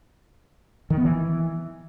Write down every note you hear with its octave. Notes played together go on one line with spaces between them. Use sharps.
D#3
B3
E3